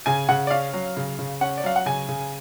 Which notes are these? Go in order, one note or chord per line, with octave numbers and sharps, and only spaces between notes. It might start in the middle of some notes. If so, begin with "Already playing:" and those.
C#3 G#5
C#3 F#5
D5
C#4 F5
F#3
C#3
C#3
C#4 F#5
D5
F#3 F5
F#5
C#3 G#5
C#3